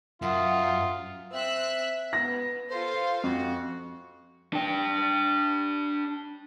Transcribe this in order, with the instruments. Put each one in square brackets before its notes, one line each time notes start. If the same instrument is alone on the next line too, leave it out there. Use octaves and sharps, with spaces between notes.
[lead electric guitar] F#2 [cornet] F4 [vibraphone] E5 F#5 D#6
[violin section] C4 E6 F#6 [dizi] E5
[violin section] B3 [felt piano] A#6
[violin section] F4 A4 F5 [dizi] C5
[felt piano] F2 [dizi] F#4
[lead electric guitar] D4 G5